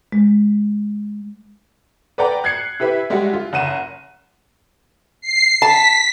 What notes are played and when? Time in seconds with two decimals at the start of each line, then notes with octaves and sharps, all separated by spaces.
0.13 G#3
2.18 B4 D5 F#5 G5 A#5
2.44 F#6 G#6 C7 C#7
2.80 E4 G4 B4 E5
3.10 G3 G#3 F#4 E5 F#5
3.33 F4
3.53 F#1 F#5 D#7 E7
5.21 C7
5.62 A5 B6